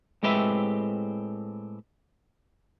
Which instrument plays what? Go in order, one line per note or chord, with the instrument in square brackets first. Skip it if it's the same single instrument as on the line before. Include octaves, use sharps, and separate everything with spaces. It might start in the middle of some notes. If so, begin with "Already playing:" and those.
[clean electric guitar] A2 G#3 C4 G4 B4 E5